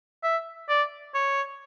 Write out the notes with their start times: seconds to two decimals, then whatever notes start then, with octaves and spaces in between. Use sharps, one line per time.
0.23 E5
0.69 D5
1.14 C#5